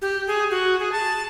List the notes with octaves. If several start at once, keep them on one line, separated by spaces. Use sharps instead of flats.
G4
G#4
F#4
G#4
A5